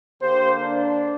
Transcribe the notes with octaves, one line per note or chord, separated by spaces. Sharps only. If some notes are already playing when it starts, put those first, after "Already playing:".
D3 A#3 G4 C5
D4